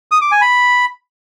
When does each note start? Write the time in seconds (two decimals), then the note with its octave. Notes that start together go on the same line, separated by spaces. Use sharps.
0.11 D#6
0.21 D6
0.31 G#5
0.41 B5